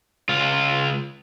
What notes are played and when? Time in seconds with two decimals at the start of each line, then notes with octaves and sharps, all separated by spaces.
0.29 C#2 F4